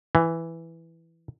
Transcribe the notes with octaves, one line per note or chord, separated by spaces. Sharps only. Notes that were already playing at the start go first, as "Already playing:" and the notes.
E3